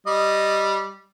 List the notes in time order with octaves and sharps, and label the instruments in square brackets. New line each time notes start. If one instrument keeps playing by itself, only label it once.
[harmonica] G3 D#5